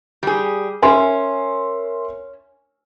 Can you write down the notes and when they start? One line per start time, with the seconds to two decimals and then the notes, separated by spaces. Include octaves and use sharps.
0.23 G3 G#4
0.82 C#4 A#4 E5 G#5 C6